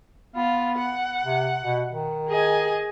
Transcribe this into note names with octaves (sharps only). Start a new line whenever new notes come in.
B3 F4
F#5
C3
B2
D#3
G#4 D#5 G#5